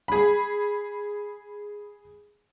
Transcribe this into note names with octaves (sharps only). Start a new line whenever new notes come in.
G#4 B5